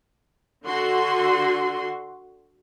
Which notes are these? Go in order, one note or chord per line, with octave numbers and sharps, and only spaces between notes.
D3 F#4 C6